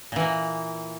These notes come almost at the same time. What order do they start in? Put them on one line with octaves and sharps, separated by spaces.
A#2 E3 A#3